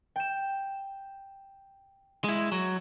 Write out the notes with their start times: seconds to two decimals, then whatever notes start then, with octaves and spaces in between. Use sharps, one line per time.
0.16 G5 E7
2.24 G#3 E4
2.52 F#3